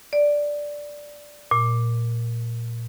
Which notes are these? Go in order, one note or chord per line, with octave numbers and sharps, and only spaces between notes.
D5
A#2